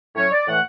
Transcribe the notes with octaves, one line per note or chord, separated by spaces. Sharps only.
A2 F#3 C#4 C#5
D5
A2 E3 A3 F#5